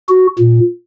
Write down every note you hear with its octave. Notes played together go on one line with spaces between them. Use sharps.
F#4
A#2